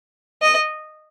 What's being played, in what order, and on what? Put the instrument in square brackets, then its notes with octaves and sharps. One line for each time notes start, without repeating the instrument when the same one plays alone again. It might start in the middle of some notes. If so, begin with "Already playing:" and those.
[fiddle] D#5